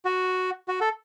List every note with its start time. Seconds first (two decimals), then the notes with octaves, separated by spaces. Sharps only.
0.05 F#4
0.68 F#4
0.81 A4